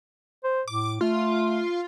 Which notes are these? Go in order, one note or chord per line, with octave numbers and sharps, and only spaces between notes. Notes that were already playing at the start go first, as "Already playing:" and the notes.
C5
A2 D6
A3 F4